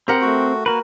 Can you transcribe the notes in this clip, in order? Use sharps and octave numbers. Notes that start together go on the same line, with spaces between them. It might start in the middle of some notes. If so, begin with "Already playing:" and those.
C4 G4 A#4 F#5
A3 F#4
A#3 F#4 A#4 B4